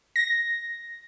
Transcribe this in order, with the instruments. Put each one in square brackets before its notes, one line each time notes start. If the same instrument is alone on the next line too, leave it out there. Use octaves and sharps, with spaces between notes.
[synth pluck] A#6